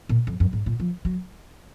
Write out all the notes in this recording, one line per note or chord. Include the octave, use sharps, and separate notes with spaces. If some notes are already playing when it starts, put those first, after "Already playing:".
A#2
F2
F#2
G#2
A#2
F3
F#3